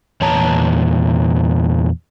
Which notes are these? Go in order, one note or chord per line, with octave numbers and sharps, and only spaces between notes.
E2 A#2 C#5 A5 A#5